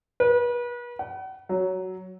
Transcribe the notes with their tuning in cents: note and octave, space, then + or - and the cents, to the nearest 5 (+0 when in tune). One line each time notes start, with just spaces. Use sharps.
B4 -35
F#5 +40
F#3 +10